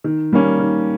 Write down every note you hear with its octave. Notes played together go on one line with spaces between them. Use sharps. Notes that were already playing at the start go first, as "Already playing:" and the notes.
D#3
G3 A#3 C#4
D#3